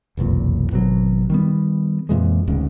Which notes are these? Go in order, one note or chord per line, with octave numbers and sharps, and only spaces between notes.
F1 B1 E2 A#2
G#1 B2 F#3
D#3 G3 B3
F2 A#2 E3 G#3
D1 D2 G#2 C#3